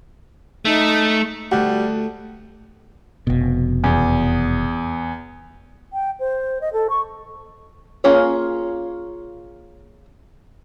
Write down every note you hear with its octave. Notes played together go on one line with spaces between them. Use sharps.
A3 D#4
D2 G3 F#4
F1 B2
E2
G5
C5
D#5
A4
C#6
A#3 C#4 F4 G#4 C#5